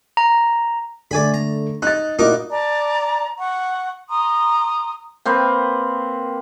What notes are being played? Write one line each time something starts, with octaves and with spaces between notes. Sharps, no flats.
A#5
D3 A3 D5 G#5 B5
A#5
D#4 F#6 A6
A#2 D#4 E4 F#4 A#4 D6
D5 A5 A#5
F#5 C#6
A#5 C6 D#6
A#3 C4 B4